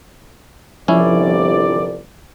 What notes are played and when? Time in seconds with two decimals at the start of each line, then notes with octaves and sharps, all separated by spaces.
0.88 G1 C2 F3 C#4 E4 D5